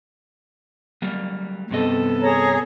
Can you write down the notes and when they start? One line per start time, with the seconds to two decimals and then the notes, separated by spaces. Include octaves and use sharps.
1.02 F#3 G3 A#3
1.71 G2 C3 B3 A4 D#5
2.22 G#4 C#5 A#5